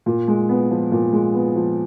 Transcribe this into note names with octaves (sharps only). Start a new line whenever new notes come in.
A#2
G#3
B3
F3
A#2
G#3
B3
F3